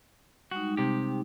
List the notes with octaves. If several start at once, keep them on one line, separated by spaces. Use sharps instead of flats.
G3 G#3 D#4 F#4
C3 G4